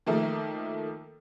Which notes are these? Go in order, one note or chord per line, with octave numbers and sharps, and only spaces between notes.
D#3 F3 A3 A#3